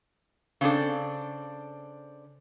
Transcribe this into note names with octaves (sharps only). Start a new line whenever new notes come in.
C#3 C4 D4 A4